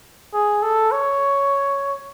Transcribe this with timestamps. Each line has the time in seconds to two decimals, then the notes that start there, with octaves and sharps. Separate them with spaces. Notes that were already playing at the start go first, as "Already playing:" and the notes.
0.34 G#4
0.63 A4
0.92 C#5